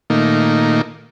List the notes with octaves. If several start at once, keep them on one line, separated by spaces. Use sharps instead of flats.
A#2 D#3 A3 A#3 D#4